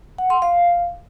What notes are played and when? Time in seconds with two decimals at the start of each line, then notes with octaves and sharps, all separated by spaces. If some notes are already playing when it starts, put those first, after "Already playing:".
0.18 F#5
0.30 C6
0.42 F5